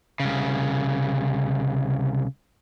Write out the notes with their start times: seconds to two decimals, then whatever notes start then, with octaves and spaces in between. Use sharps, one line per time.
0.20 C2 C#3